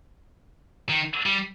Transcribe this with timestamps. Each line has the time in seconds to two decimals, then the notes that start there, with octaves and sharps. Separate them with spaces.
0.89 D#3
1.26 G3